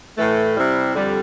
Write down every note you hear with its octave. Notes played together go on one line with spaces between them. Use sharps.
A2 E3 A3
C3 G3 C4 E4
F2 D3 G3